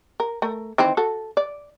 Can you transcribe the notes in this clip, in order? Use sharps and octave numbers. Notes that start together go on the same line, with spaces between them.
A#4
A3 A#4
D#3 E3 C4
F#4 A4
D5